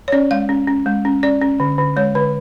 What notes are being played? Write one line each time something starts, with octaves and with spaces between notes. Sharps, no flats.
C#5
C#4 D5
G#3 F5
C#4
C#4
G#3
C#4
C#4 D5
C#4
D3
D3
G#3 C#5
D3 B4